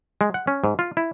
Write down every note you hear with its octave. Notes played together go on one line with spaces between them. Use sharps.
G#3
F#5
C#4
G#2
F4
E4